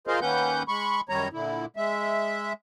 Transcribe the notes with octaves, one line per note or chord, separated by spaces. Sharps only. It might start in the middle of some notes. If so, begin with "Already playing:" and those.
F4 G#4 A#4 C5 D#5 F5
D#3 A#3 C#4 B4 F#5 G6
G#3 B5 C#6
F#2 D#3 G3 C#5 A#5
A#2 D3 E4
G#3 E5